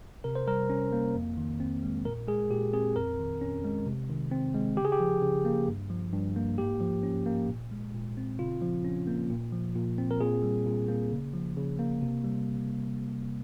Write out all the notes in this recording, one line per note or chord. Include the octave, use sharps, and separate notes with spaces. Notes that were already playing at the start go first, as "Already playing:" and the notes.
C3 A#4
C5
G3 A#4
C#4
A#3
F2
D#3
C4
G#3
A#2 A#4
G#3 G#4
A#2 G4
C4 G#4
F2 A#4
D#3
C#4
G#3
C3
D#3
C4
G#3
C#3 G4
G#4
G4
F3
C#3
A#3
G2
F3
G2
A#3
G#2 G4
F3
C#4
A#3
A#2
G#3
A#2
C4
C#3 F4
F3
C#4
A#3
A#2
F3
A#2
C4
A#4
A#2 G#4
G3
A#2
A#3
C#3
F3
C#3
A#3
C3
G3